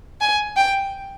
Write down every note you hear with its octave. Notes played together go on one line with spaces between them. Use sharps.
G#5
G5